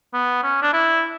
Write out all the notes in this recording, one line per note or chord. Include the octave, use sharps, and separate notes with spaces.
B3
C#4
D4
E4